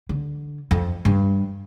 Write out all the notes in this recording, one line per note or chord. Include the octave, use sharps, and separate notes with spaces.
D3
F2
G2 G3